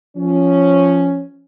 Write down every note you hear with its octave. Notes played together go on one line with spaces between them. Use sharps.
F3 C#4